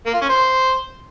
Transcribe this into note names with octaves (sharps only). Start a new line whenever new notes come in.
A#3
F4
C#4
C5